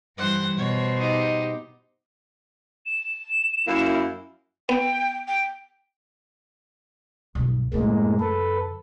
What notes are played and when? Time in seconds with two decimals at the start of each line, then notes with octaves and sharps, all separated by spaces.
0.18 G2 E3 C5 F#5
0.57 B2 C5 C#5
0.99 D#4 G4
2.86 E7
3.67 F#2 A#3 E4
4.69 B3 G5
5.28 G5
7.35 B1 G2
7.74 F#2 A2 C#3 G#3 A#3
8.20 A4 B4